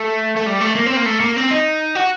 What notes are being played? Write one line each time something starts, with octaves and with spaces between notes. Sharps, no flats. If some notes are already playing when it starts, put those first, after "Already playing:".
Already playing: A3
A3
G3
A3
A#3
C4
A#3
A3
A#3
C4
D#4
F#4